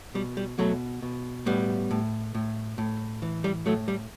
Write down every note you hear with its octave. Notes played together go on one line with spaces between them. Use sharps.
B2 G3
G3
B2 F#3 A3
B2
A2 G3 B3
A2
A2
A2
E3
G3
A2 F#3 A3
G3